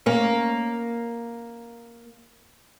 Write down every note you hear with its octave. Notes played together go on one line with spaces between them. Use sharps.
A#3 C#4